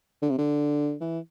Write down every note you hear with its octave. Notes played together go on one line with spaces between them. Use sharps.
D3
C3
D3
E3